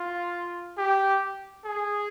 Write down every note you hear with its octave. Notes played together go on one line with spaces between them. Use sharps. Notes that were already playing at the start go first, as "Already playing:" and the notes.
Already playing: F4
G4
G#4